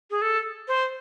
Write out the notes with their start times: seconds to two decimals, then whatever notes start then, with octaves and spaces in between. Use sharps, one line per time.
0.11 G#4
0.22 A4
0.68 C5